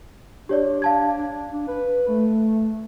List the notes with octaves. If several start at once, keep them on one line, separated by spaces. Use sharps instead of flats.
D4 G4 C#5 D5
F5 A5 G#6
D4
B4
A3